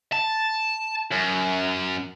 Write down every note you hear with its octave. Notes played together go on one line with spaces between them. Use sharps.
A5
F#2